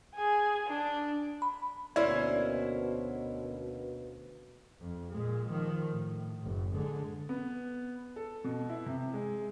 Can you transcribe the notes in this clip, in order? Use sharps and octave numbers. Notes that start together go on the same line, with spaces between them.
G#4 G#5
D4
B5
D2 B2 A#3 C#4 E4 C5 D5
F2
A#2 G#3
D#3 F3
A2
F#1
D3 G#3
B3
A4
B2
E4
C3
G#3